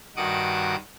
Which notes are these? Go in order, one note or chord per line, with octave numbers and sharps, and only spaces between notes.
G2 D#3 F#4 F#5 D6 D#6